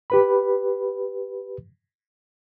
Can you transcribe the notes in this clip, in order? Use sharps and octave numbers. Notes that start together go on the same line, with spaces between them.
G4 B4 B5